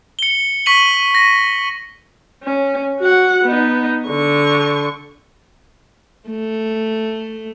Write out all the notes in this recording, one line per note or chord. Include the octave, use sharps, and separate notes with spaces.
C#7 G7
C#6 B6 D#7 F#7
A#6
C#4
F#4 F#5
B3 D#4
D3 C#6
A3